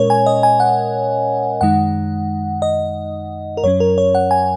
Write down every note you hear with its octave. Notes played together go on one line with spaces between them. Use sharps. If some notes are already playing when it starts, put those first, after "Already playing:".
Already playing: A#2 G#3 C#4 A#4 C#5
G#5
D#5
G#5
F#5
F#2 D#3 G#3 D#4 F#5
D#5
A#4
F#2 F#3 C#4 C#5
A#4
C#5
F#5
G#5